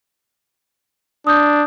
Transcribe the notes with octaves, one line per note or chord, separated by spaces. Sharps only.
D4 D#6 G6